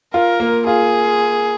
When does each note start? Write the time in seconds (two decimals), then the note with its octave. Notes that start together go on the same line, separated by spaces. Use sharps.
0.14 F4 A#4
0.40 A#3
0.66 F4 G#4